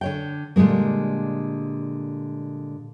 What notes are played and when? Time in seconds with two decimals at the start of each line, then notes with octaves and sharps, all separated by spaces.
0.01 D3 C#5 G5
0.56 A#2 D3 G3 G#3 A#3